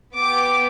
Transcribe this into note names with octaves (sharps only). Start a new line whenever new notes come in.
B3 G4 D6